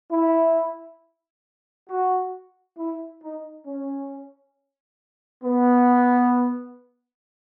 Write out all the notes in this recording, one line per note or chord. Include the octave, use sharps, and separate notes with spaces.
E4
F#4
E4
D#4
C#4
B3